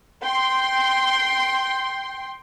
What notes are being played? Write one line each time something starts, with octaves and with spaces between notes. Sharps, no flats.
G5 C6